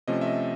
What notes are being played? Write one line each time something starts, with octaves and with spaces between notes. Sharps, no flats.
C3 F3 A3 C#4 D#5
E5
D#5